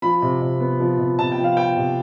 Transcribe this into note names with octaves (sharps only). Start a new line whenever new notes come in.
F3 B5
C3
C3
B3
F3
C3
C3 A5
G5
F3
F5
B3 G5
C3